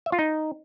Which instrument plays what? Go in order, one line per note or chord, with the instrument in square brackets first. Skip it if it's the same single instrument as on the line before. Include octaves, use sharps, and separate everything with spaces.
[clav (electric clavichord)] E5
F4
D#4